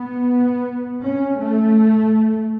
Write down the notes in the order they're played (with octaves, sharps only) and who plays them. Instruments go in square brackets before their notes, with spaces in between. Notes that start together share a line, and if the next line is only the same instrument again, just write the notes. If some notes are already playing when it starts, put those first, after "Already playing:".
Already playing: [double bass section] B3
C#4
A3